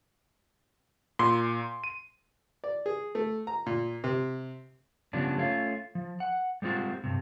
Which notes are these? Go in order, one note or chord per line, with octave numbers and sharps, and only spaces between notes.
A#2 C6
D#7
D5
G#4
A3
A#5
A#2
C3
C#3 F3 G3 B3 D4
A3 C#4 F4
F3
F#5
G3 G#3 C4 F4 F#4
G2 C3